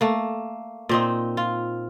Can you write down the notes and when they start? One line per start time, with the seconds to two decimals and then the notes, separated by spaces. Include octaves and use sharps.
0.01 A3 A#3
0.89 A#2 C4 D#4
1.37 F4